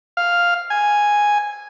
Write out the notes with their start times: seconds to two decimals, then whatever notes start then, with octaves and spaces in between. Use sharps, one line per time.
0.17 F5
0.70 G#5